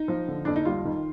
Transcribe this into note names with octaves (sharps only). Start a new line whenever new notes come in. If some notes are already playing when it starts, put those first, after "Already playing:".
Already playing: D#4
F3
D3
F2 D4
D#4
G3 F4
D#3